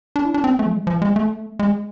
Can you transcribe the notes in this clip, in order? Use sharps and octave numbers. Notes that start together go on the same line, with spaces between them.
D4
E4
D4
C4
B3
A3
F3
G#3
F3
G#3
A3
G#3